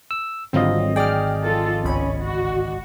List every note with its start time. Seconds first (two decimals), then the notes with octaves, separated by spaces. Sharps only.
0.11 E6
0.53 G#1 D3 F#3 G3 C4 F4 D#5
0.96 G#4 D5 G5 F6
1.43 F3 F4 A4
1.84 G1 C#2 C#4 B5
2.24 F#4